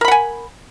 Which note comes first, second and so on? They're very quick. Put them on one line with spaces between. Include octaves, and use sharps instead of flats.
A#4 B5 F#5 G#5